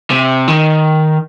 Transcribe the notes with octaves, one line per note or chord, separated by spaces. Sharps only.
C3
D#3